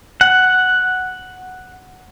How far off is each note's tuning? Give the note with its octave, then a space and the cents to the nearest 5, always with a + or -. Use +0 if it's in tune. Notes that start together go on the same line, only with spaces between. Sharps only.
F#5 +0